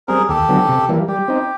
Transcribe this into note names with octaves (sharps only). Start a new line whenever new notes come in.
G3 C4 G#4 A#4
D#2 G4 A4
D3 F#3 B3
C3
E3 G3 A#3
G3 G4
C4 D#4